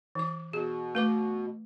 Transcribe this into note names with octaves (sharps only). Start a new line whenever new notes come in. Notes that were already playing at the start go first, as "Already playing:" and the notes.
E3 D6
B2 G#4
A3 B4 D6